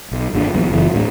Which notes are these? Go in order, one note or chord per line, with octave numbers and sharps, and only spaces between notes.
B1
G#1 E2 A#3 D4
A#1 E2 F#3
F#1 E3
D1 A1 A2 D4